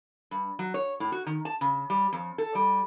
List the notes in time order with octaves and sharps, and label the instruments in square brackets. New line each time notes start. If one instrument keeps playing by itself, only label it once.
[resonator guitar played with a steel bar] G2
F#3
C#5
A2
F#4
D#3
A5
C#3
G3
F2
A4
G3